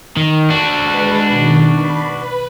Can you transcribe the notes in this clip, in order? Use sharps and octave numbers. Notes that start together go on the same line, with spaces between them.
D#3
D4 F#4
G#3 B4
B2 D#3
B5
B4